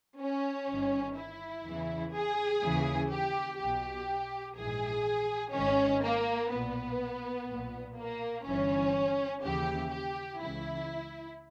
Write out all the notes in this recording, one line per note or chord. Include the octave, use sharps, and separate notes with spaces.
C#4
G1 G2 D#3
E4
E2 C#3 E3
G#4
D#2 C#3 E3
G4
B1 B2 G4
A#1 G#2 E3 G#4
G#1 G#2 D#3 C#4
A#3
B1 A#2 B3
B1 A#2
A#3
G1 G2 E3 C#4
D#2 C#3 E3 G4
G4
C#2 C#3 E3 E4